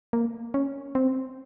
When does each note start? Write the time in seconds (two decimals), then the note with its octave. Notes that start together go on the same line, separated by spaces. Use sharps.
0.13 A#3
0.54 C#4
0.95 C4